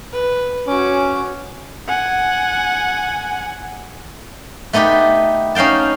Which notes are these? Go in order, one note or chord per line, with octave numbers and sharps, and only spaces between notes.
B4
C#4 F#4 D6
F#5 G#5
A3 B3 D#4 G4 B4
C#4 D#4 F5 G5 A5